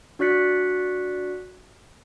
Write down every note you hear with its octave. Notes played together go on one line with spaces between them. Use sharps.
D4 F#4 D5 F#6 B6 C#7